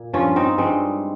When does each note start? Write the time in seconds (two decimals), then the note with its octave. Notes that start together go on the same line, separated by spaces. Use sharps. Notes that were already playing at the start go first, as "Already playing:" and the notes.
Already playing: A#2
0.13 G2 F3 C#4 F4
0.36 C4 D#4
0.58 G2 G3 G#3 C4